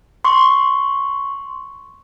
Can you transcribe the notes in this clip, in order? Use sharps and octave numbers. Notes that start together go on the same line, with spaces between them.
C6 C#6